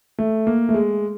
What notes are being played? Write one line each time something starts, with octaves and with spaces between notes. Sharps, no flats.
A3
A#3
A3
G#3